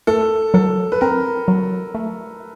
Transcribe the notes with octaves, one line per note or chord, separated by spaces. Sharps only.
A3 A4
F#3 A4
B4
C4 A#4
F#3
A3